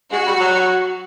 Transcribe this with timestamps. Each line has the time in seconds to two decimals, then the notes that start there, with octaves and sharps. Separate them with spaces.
0.12 G#3 F#4
0.26 G3
0.40 F#3